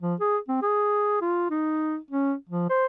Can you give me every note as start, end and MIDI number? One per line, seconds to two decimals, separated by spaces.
0.02 0.15 53
0.20 0.37 68
0.49 0.58 60
0.63 1.21 68
1.22 1.50 65
1.50 1.97 63
2.11 2.34 61
2.50 2.69 53
2.70 2.86 72